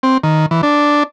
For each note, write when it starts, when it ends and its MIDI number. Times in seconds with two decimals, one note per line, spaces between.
0.03 0.18 60
0.23 0.46 51
0.51 0.61 52
0.63 1.03 62